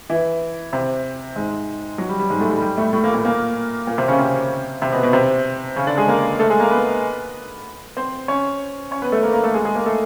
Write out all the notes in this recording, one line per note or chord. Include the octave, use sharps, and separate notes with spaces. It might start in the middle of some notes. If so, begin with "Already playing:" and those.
E3 E4
C3 C4
G#2 G#3
F#3
G3
G3
G#2 G#3
A2 A3
G3
G3
A2 A3
A2 A3
A#2 A#3
A#2 A#3
A#2 A#3
A#2 A#3
C3 C4
C#3 C#4
C3 C4
C3 C4
B2 B3
B2 B3
C3 C4
C#3 C#4
D3 D4
G#3 G#4
A#3 A#4
A3 A4
G#3 G#4
A#3 A#4
B3 B4
C4 C5
C#4 C#5
C#4 C#5
B3 B4
A3 A4
A#3 A#4
A#3 A#4
A3 A4
G#3 G#4
G#3 G#4
A#3 A#4
A3 A4